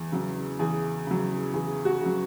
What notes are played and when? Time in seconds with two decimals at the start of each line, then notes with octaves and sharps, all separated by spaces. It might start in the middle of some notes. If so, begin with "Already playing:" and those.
Already playing: E2
0.12 C#3 F#3
0.59 E2 G#4
1.07 C#3 F#3
1.54 E2 G#4
1.85 F#4
2.01 C#3 F#3